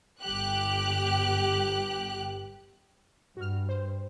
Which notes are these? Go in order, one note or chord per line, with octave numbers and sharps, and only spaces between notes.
G1 G4 F#6
G2 F#4 F6
C5